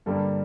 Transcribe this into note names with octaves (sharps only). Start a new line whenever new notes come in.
G2 D3 G3 A#3 A4